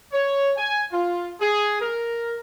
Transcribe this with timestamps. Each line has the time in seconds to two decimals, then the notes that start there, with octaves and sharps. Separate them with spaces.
0.13 C#5
0.57 G#5
0.92 F4
1.41 G#4
1.81 A#4